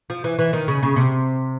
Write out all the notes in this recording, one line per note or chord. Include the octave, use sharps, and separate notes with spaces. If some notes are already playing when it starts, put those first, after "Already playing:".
F3
E3
E3
D#3
C#3
C#3
C3